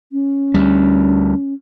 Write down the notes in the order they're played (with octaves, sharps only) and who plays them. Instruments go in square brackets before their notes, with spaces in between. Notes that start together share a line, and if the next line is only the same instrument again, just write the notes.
[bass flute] C#4
[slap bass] D2 G3